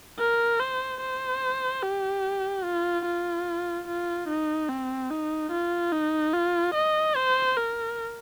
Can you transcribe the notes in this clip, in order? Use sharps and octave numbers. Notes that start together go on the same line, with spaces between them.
A#4
C5
C5
G4
F4
F4
F4
D#4
C4
D#4
F4
D#4
F4
D#5
C5
A#4